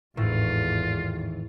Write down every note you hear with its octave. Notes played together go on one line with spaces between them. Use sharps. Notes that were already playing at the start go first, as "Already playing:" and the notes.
G#1 E2 A2 D#3 E3 F4